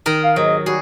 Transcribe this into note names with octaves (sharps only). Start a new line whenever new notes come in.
D#3 A#4 D#5
F5
D#2 G#2 F#3 D#5
G3 C#4 F#4 G#4